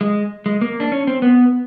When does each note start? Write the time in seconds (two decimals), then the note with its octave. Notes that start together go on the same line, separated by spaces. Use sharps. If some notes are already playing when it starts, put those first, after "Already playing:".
0.01 G#3
0.46 G#3
0.61 A#3
0.80 D4
0.92 C#4
1.07 C4
1.22 B3